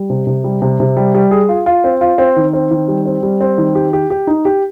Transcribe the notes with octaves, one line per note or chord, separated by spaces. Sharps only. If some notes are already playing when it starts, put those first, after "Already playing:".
Already playing: G3
C3
C3
G3
C3
C3
G3
G3
G#4
F4
F4
C4
F4
C4
D#3
C4
D#3
G3
C4
G3
C4
D#3
G4
G4
G4
D#4
G4